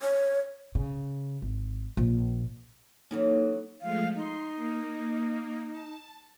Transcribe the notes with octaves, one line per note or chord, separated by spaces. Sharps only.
C#5
C#3
G#1
A#1
E3 F#3 A#3 C#4 D#4 A4
F3 G#3 A3 F5
D#4 C6
A#3
A5